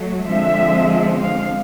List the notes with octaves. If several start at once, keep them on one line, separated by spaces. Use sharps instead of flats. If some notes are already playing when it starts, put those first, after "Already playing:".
Already playing: F#3 A3
D3 F3 G#3 C4 E5
F5